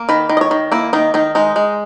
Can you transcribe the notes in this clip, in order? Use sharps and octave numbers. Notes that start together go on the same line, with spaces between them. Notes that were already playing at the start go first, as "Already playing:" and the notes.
Already playing: A#3
D#3 B4
D#3
D#5
C#5
D#3
A#3 E4
D#3 D#4
D#3 D#4
G#3 D#4
G#3